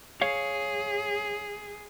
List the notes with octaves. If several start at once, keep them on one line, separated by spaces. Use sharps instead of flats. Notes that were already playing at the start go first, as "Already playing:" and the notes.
G#4 C#5 F5